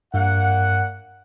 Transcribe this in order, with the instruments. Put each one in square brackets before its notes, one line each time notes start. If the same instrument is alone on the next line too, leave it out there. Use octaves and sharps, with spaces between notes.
[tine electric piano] G2 [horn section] A#2 A#3 F#5